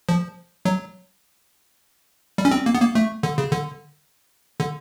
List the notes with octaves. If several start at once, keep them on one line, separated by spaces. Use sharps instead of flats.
F3
F#3
G3
C#4
C4
A#3
B3
A#3
A3
D3
C#3
D3
D3